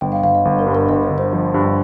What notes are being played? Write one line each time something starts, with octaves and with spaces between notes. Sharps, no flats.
G1 G5
F5
G1 F5
D#5
G1
A#4
G2
A#4
G1 D#5
C#5
G1
C5
F3 A#4
G2